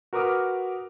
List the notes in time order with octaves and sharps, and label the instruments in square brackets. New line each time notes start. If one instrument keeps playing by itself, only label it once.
[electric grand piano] F#4 A#4 B4 D6 D#6 F6